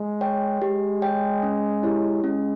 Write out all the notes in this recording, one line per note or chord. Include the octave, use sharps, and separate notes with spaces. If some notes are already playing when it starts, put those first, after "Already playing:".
Already playing: G#3
C#5 G5
G#3 G4
C#5 G5
C#4
E4 G4 C#5
G#3 C#4